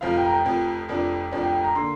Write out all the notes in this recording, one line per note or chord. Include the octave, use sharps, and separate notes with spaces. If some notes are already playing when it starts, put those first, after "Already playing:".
F1 F2 F3 F5
G5
A#5
G5
F1 F2 F3
F1 F2 F3 D4
F1 F2 F3 D4
G5
G5
A#5
D3 A#3 C6